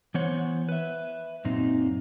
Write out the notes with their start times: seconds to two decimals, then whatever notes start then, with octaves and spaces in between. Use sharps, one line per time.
0.14 E3 B3 C5 C#5 F#5
0.69 B4 E5
1.45 F#2 A#2 C4 D#4